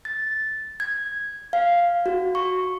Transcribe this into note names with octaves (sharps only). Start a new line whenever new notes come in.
A6
G#6
F5
F#4
C#6